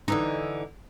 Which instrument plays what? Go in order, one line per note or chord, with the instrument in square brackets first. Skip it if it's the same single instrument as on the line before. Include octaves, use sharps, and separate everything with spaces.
[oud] D3 E3 D#4